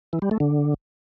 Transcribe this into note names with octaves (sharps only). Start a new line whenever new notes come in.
E3
G3
A3
D3